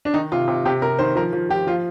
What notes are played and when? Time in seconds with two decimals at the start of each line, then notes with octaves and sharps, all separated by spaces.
0.05 D4
0.14 D#3 D#4
0.32 C3 F4
0.48 C3
0.65 C3 G4
0.82 C3 A#4
0.99 D#3 C5
1.16 F3 A#4
1.33 F3
1.49 F3 G4
1.67 F3 F4